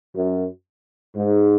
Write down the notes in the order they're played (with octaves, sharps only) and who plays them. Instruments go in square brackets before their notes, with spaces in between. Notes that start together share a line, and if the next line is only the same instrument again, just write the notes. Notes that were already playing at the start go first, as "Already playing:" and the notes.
[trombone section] F#2
G#2